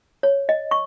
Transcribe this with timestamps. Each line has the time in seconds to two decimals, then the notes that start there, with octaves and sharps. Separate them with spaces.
0.23 C#5
0.49 D#5
0.71 C#6